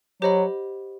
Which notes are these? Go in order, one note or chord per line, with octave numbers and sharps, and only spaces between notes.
F#3 G4 C5 D#5 F#5 B5